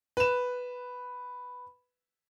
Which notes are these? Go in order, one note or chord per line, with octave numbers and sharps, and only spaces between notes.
B4 E7